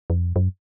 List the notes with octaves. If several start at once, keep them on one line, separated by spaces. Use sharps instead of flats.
F2
F#2